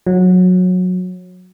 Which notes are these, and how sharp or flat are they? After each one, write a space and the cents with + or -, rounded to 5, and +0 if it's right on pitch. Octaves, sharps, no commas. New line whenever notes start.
F#3 -20